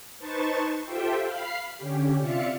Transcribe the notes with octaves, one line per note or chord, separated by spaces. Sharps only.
D#4 B4 C5 A5 C#6 A6
F4 G4 A4 C5 E5 G5
F5 B5 C7
D3 C#4 G4
C3 F4 D5 E5 F5 C#7